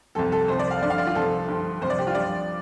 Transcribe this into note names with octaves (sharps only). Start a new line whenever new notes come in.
C2 C3 F3 A4
A4
C2 C3 F3 C5
D5
F5
G2 D3 F3 D5
F5
D5
F4
C2 C3 F3 A4
G2 D3 F3
C2 C3 F3 C5
D5
G4
F4
G2 F3 D5